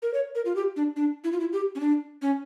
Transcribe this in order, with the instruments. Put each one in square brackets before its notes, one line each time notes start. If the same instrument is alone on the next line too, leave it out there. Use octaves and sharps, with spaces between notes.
[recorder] A#4
C#5
A#4
F4
G4
D4
D4
E4
F4
E4
G4
C#4
D4
C#4